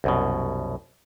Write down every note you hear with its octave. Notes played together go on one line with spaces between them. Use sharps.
C2 F#2 B2